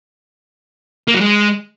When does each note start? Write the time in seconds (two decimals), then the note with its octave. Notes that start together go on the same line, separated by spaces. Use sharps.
1.08 A#3
1.14 F#3
1.21 G#3